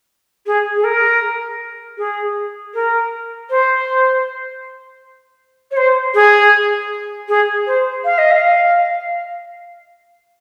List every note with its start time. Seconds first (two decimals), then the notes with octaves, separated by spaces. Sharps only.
0.46 G#4
0.75 G#4
0.84 A#4
1.98 G#4
2.74 A#4
3.50 C5
5.71 C#5
5.76 C5
6.14 G#4
7.28 G#4
7.66 C5
8.04 F5
8.18 D#5
8.31 F5